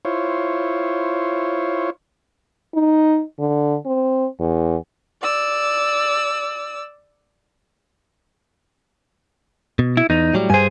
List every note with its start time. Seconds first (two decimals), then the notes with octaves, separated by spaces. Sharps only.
0.05 E4 F4 C5 C#5
2.75 D#4
3.39 D3
3.86 C4
4.40 E2
5.22 D5 E6
9.79 B2
9.97 E4
10.10 E2 D#4
10.33 A2 F#3 G3
10.50 G2 G#4 C5 G#5